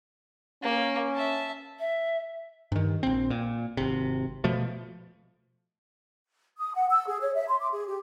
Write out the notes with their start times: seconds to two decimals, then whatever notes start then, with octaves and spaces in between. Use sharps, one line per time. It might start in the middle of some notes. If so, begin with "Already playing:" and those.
0.62 A#3 C#4
1.15 E5 A5
1.80 E5
2.72 G2 D#3
3.03 A#1 C4
3.30 A#2
3.77 G#1 C3
4.44 B2 F3 A3
6.58 D#6
6.75 F#5
6.90 E6
7.07 G#4
7.21 C#5
7.35 E5
7.48 C6
7.60 D6
7.72 G#4
7.87 G4